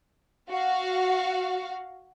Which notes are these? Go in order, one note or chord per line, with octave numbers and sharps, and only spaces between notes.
F#4 F5